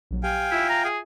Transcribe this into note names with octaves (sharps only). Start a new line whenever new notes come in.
A#1 F#3
G4 F5 G5 G#5
E4 F4 E5
A#5
G#4